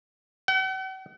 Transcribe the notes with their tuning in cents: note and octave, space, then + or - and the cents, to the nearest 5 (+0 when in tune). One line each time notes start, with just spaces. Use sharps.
F#5 +45